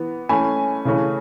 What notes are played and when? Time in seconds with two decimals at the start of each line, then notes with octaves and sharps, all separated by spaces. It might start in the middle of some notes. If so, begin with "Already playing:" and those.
Already playing: E3 B3
0.29 E3 A3 C#4 G#5 B5
0.85 C#3 E3 A3 C#4